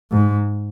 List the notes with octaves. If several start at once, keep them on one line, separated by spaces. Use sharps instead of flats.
G#2